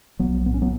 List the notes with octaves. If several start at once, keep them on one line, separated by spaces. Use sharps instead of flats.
B1 F#3 B3
A2 B3
C#4
F#3 B3